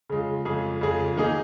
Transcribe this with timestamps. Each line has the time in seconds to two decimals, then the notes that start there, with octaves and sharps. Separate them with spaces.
0.10 C#3 G#3 F4
0.45 F2 C#3 G#3 F4 G#4
0.81 F2 C#3 G#3 F4 G#4
1.16 D#3 A#3 D#4 G#4